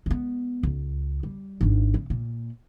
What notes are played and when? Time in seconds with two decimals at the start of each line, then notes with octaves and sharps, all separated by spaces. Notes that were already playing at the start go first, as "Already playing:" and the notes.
0.06 G#3 B3
0.63 C#2
1.23 G3
1.61 G#1 D4
1.94 C#3
2.10 A#2